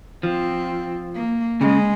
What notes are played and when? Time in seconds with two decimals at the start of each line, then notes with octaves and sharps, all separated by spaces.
0.23 F3 C4
1.15 A#3
1.61 C#3 G#3